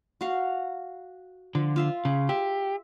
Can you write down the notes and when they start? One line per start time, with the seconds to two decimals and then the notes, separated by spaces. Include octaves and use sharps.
0.21 F#4 F5
1.55 D3 F3
1.76 F4 E5 C6
2.05 C#3 G#4
2.29 G4 E5